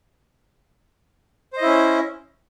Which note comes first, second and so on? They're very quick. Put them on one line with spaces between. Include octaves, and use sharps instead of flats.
C5 D#5 E4 C#4